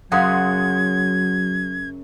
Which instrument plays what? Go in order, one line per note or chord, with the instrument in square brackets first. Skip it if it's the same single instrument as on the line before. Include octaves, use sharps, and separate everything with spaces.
[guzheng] F#2 C#3 [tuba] F#3 [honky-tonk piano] F#5 C6 D#6 [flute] G#6